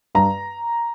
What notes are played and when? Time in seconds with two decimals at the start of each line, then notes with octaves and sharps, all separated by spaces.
0.15 G2 A#5